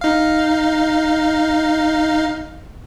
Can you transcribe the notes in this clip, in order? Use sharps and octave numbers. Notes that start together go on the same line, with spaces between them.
D#4 F5